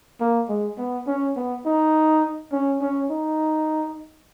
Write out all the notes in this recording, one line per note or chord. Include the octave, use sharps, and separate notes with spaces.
A#3
G#3
B3
C#4
B3
D#4
C#4
C#4
D#4